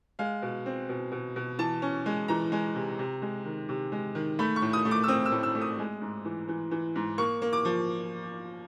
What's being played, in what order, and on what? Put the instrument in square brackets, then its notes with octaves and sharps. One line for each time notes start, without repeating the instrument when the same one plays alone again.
[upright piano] G#3 F5
B2
C4
B2
B2
B2
E3 A5
C#4
G#3
E3 A#5
G#3
C3
C3
G#3
D#3
C3
G#3
D#3
A3 B5
C#6
A2
D#6
A3
D6
E6
C4 D#6
E6
A2
E6
A3
D#6
G#3
G#2
E3
E3
E3
G#2
A#3 C#6
A#3
D6
F3